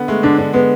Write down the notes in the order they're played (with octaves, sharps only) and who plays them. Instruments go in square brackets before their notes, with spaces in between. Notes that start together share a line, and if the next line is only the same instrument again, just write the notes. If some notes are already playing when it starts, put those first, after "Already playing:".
Already playing: [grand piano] D3 B3
[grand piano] G#3 [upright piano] A3
[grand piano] D3 [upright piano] D4
[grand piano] D3 [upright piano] D4
[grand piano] G#3 [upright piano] B3